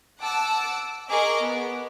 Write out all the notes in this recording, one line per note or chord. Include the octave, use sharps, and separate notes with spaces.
F#5 A5 D6 E6
G#4 A#4 D#5 C#6 D6
B3